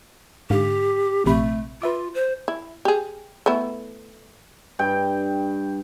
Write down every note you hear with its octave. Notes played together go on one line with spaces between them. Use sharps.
G#2 D3 G4 F5
A#1 C3 A3 B5
F4 B4 E5 D6
C5
E4
G4 G#4
A3 B3 E4
G2 G5